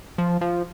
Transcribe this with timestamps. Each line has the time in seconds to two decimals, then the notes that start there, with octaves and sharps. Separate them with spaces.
0.18 F3
0.41 F3